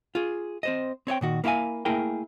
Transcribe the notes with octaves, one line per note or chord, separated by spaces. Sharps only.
F4 G#4
C4 C5 D#5
C4 C#5 D#5 G5
A#2 D#3 F#4
A#3 E4 G4 F5 G#5
A3 A#3 E4 G#4 A#4 G5